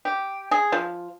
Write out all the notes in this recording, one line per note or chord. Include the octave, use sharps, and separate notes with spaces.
G4
G#4
F3